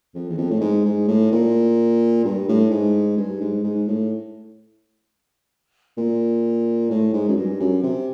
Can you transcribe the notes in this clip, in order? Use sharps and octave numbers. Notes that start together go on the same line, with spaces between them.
F2
E2
F2
A2
G#2
G#2
A2
A#2
G2
A2
G#2
G2
G#2
G#2
A2
A#2
A2
G#2
F#2
G2
F#2
C3